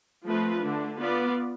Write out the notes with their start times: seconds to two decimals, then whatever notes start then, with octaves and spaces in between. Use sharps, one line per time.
0.25 F3 A3 C4 F4 B4
0.61 D3 A3 D4
0.97 B3 F4 B4 D5